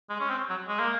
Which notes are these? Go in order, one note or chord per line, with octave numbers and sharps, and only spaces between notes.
G#3
C#4
C4
F#3
G#3
A#3